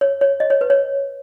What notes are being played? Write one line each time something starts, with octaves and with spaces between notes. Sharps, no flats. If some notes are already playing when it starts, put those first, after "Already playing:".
C#5
C#5
D#5
C#5
B4
C#5